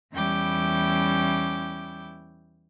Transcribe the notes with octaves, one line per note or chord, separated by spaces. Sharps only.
E2 G3 C#4 E4 G5 D6